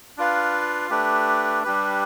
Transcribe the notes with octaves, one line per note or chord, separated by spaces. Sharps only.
D4 F4 B4 F5
A3 D4 G4 B4
G3 D4 G4 B4